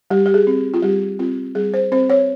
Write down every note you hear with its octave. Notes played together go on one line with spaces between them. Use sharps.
G3 G4
G4
G#4
C4
F4
G3 G4
C4 F4
G3 G#4
C5
C4 C5
C#5